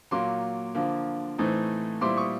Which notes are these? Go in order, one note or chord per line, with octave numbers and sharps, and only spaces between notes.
A#2 F#3 A#3 C6 D6
D3 F3 A#3
A2 E3 A3 C4 D#4
A#2 G3 C4 E4 C6 D6
C#6 D#6